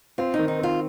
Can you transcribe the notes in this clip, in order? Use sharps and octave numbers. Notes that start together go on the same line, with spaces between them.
C4 F4
D#3 D#4
D#4
C4 F4